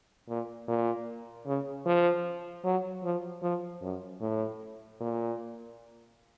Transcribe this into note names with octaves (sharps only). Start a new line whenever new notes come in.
A#2
A#2
C#3
F3
F#3
F3
F3
F#2
A2
A#2